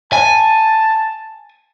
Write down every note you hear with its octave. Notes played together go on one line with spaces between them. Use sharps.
G#5 A5